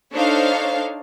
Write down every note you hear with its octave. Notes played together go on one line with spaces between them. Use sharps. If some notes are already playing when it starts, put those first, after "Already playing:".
D4 D#4 A4 C5 C#5 F5